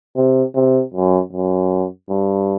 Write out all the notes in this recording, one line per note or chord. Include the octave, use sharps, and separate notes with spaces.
C3
C3
F#2
F#2
G2